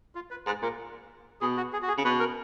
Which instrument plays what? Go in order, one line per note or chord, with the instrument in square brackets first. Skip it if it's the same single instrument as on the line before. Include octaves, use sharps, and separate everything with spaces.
[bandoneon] F4
B4
[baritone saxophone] G#2 [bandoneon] B4
[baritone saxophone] A#2 [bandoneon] A#4
[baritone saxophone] B2 [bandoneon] G#4
[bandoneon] F#4
G#4
F#4
G#4
[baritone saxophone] C#3
[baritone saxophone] B2 [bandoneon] B4
[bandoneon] A#4